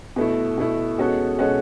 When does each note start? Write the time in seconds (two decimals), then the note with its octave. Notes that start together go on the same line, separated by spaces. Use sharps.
0.16 B2 A3 E4
0.58 B2 A3 E4
0.98 B2 G#3 C#4 F#4 A4
1.39 B2 G#3 C#4 F#4 A4